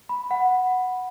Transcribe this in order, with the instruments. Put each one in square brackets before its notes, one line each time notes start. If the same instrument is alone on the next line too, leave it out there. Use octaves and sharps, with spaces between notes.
[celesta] B5
F#5